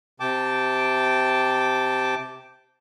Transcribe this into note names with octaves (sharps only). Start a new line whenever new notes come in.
C3 G5 A5 D6